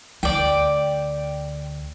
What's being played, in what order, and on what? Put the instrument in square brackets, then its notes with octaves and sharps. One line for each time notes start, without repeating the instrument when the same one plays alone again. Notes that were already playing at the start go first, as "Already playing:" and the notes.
[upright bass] D2 [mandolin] D5 G5